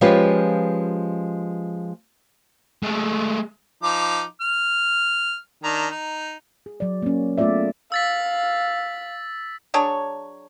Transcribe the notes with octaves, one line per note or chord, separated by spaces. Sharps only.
F3 G#3 C#4 F4 G4 B4
G#3 A3
F3 D#4 D6
F6
D#3 D4 A#5
D#4
G#4
F#3 D5
A#3 C#4
A3 B3 F4 G#4 D5 E5
F5 E6 A6 B6
F#3 D4 G#4 C#5